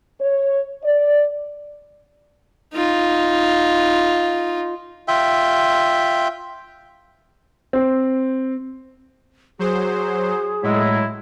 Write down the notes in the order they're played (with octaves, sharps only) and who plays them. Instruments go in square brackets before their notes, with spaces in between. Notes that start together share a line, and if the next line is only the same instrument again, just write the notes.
[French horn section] C#5
D5
[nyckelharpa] D#4 F4
[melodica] F4 E5 G5
[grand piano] C4
[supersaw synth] F#3 C5 [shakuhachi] G#4
[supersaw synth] A2 [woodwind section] F#3 G#3 E4